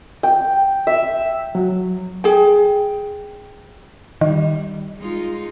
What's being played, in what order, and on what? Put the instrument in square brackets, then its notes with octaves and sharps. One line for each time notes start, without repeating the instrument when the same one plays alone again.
[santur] G5
E5
[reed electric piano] F#3
[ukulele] G#4 G5
[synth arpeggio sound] D#3 [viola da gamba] G3
[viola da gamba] G#3 D#4 F4